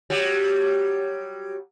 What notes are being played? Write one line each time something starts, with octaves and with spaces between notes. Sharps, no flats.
F#3 G3